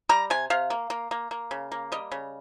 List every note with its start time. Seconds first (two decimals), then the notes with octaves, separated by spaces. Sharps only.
0.09 G3 A#5
0.30 C3 G#5
0.50 C3 F5
0.70 A#3
0.90 A#3
1.11 A#3
1.31 A#3
1.51 C#3
1.72 A#3
1.92 G3 D#5
2.12 C#3